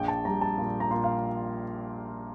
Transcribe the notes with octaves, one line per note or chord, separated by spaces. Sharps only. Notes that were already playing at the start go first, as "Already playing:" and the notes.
Already playing: A#1 G5
A5
G3 A#5
A5
A#2
A#5
A#2 C6
F5